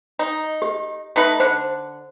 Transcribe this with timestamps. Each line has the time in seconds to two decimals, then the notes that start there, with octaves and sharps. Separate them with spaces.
0.19 D#4
0.62 G4
1.16 A3 D#4 B4
1.40 D3 C5